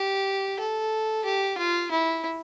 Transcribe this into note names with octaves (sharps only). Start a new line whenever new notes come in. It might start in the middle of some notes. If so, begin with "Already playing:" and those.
Already playing: G4
A4
G4
F4
E4